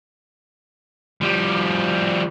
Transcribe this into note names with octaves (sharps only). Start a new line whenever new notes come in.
F3 G3